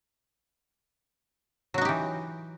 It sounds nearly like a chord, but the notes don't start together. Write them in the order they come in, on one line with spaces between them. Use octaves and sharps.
F#3 F#4 D#4 G4 E3